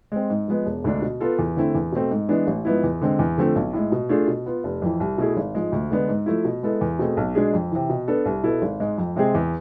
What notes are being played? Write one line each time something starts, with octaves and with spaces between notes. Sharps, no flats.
G#3 C4
G#2
F3 G#3 B3
E1
D2 D3 G#3 D4
B2
B3 F4 A4
E2
D3 A3 C4 E4
E2
B2 A3 C4
G#2
E3 G#3 B3 D4
A1
G#2 F3 B3 E4
E2
D3 G#3 C4
E2
D3 F3 A3 C4
B1
A2 G#3
B2
A3 D4 F4 G#4
B2
B3 F4
F1
F2 E3
C2
B2 A3 E4 G#4
G#1
G#2 F3 G#3
D2
D3 G#3 B3 D4
G#2
F3 A3 E4
B2
G#3 B3 E4 A4
E2
B2 A3 C4 G#4
B1
B2 G#3 D4 G#4
F2
C3 E3
B2
B3 D4 A4
C2
B2 B3 E4 A4
G#1
G#2 G#3
F2
C3 G#3 C4 G#4
E2